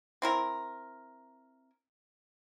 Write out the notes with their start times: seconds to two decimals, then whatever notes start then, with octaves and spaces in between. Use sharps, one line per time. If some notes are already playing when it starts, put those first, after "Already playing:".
0.22 C4 E4 A#4